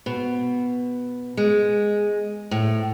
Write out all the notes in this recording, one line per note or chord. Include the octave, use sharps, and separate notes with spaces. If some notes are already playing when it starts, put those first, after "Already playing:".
B2
G#3
A2